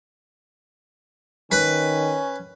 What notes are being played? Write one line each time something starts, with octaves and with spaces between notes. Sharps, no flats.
D#3 C#4 B4